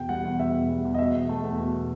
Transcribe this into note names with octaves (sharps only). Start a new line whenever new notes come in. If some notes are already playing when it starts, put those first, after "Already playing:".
Already playing: E2 B2 G5
G3 F#5
E2
B2 E5
E2
G3
E2
D#5
B2 E5
E2
A3
E2
B2